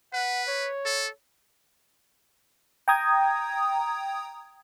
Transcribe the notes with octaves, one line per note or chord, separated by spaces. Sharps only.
B4 F#5
C#5
A4
G5 A#5 D#6 G#6